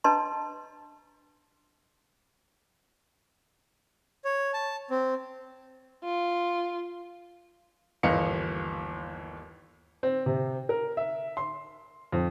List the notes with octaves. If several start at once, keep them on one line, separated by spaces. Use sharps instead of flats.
D4 B4 D#5 A5 A#5 C6
C#5
A5
C4
F4
G1 D#2 E3 D#5 F5 C#7
C4
C3
A#4
E5
C6
F2